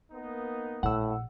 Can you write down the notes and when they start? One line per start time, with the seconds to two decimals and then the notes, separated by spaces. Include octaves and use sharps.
0.12 A#3 B3 D#4
0.83 A#1 A2 F#5 E6